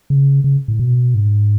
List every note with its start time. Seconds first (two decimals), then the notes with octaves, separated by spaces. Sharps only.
0.10 C#3
0.44 C#3
0.68 A2
0.79 B2
1.14 G#2